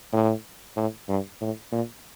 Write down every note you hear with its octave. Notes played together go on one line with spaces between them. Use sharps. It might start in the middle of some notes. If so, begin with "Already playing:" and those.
A2
A2
G2
A2
A#2